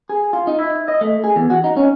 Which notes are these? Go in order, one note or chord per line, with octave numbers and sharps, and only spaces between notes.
G#4
F4
D#4
E4
D#5
A3
G#4
E2
F#4
D#4
C#4